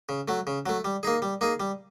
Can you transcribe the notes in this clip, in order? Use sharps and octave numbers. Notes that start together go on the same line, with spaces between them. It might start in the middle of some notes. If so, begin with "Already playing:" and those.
C#3
F#3 A3
C#3
F#3 A3
G3
A#3 D#4 G#4
G3
A#3 D#4 G#4
G3